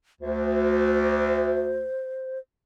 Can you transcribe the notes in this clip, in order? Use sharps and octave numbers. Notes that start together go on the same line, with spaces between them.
D2 C5